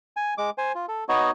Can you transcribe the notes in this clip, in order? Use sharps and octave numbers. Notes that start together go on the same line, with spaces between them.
G#5
G#3 D6
C5 G#5
F4
A4
B3 D#4 F#4 C#5 D#5